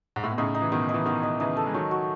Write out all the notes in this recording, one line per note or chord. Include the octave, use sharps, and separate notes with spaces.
G#2
A2
B2
A2 C#3 D#4
D#4
E3
B2 D#3 D#4
D#4
E3
B2 D#3 D#4
D#5
C#3 E3 D#4
A4
G#3
D#3 F#3 C#5
F#4